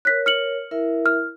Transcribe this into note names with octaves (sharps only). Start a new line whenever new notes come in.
A#4 C#5 F#6 B6
F6 C#7 F#7
E4 A#4 E5
F6